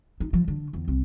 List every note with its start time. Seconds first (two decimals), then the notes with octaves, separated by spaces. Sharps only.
0.20 D#4
0.33 F3
0.48 D3
0.73 E2
0.88 C2